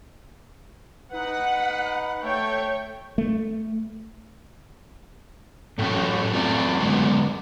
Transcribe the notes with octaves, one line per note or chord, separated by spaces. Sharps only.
D#4 B4 F#5
A3 C#5 G5
A3
F#2 A2 A3 C#4
C4 F4 D5
D3 G#3 B3